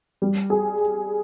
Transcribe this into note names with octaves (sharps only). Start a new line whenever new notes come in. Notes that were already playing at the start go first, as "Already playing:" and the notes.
G3
G#4